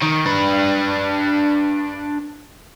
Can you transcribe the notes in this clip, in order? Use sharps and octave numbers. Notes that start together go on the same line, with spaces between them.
D#3
D4 B4